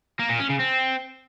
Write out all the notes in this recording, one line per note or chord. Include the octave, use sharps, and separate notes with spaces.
A#3
A#2
C#4
C#3
C4